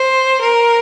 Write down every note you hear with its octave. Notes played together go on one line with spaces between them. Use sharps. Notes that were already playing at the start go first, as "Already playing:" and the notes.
Already playing: C5
A#4